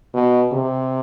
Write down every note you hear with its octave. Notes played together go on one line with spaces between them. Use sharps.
B2
C3